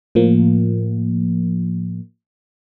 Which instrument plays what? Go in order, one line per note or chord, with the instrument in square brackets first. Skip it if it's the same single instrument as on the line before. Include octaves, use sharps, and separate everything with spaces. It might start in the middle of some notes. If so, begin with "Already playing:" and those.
[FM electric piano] A2 F3 A#3